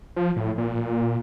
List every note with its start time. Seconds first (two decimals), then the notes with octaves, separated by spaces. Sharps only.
0.16 F3
0.36 A2
0.58 A#2